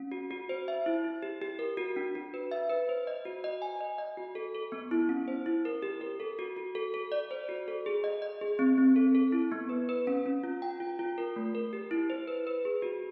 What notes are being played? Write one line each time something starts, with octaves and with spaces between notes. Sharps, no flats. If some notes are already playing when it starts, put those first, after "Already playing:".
Already playing: C#4
F#4
F#4
C5
E5
E4
E4
G4
G4
A#4
F#4
D4
F#4
B4
E5
B4
C5
D#5
F#4
D#5
G#5
D#5
D#5
F#4
A4
A4
B3
E4
C#4
C5
E4
A#4
G4
A#4
A4
F#4
F#4
A4
A4
D5
C5
F#4
A4
G#4
D#5
D#5
G#4
C4
C4
A4
A4
E4
B3
B4
B4
C#4
C#4
F4
G5
F4
F4
A#4
A3
A#4
G4
E4
C5
B4
B4
G#4
F#4